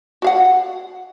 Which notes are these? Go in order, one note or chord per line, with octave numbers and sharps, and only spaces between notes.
F#4 F5 F#5